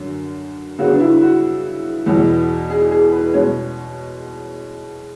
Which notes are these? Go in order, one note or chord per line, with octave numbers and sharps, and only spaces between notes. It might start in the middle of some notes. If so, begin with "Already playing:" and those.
Already playing: F#2 D3
C#3 F#3 B3 F#4
D4
E4
F#4
E2 B2 F#3
G#4
G#4
B4
B2 G#3 C#4 C#5